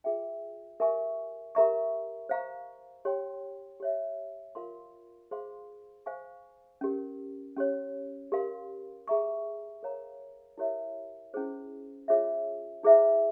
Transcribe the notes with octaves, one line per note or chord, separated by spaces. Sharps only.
F4 G#4 E5 G5
G4 A#4 E5 G#5 C#6
G4 A#4 E5 A#5 C#6
C5 F5 A#5 C#6
G4 C#5 G5 C6
G4 C#5 E5
F4 A#4 F5 C6
G#4 C5 F5 C6
C5 F5 G#5 C#6
C#4 G4 A#4
C#4 G4 C#5
G4 A#4 F5 C6
G#4 E5 A#5 C#6
A#4 C#5 F5 A#5
E4 G4 A#4 C#5 E5
C#4 E4 G#4 C5
F4 G#4 C#5 E5
E4 G#4 C5 E5